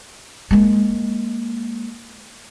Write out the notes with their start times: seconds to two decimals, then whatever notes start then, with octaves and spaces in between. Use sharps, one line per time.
0.51 G#3 A#3